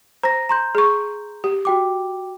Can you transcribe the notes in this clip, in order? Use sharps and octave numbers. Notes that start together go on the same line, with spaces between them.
C5 A#5 A#6
A#5 C6 G6
G#4 C#6
G4
F#4 G5 D6